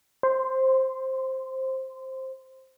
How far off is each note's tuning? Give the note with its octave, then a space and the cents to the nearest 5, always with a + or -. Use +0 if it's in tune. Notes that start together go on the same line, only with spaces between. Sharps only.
C5 +10 C6 -20